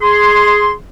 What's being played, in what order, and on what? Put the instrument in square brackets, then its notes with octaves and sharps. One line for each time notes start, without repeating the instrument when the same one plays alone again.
[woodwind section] G#4 C6